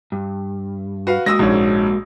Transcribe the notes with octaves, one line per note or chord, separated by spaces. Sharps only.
G2
F#4 B4 F5
G#3 A#3 F#4 D#6 E6 A#6
A#1 G#2 C#4